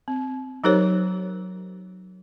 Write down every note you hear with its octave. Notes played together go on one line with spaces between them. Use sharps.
C4
F#3 D#4 G4 A#4 C5 C#5